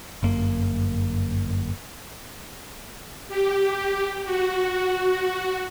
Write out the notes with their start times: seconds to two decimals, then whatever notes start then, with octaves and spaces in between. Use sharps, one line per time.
0.23 G1 F#2 A#3
3.28 G4
4.25 F#4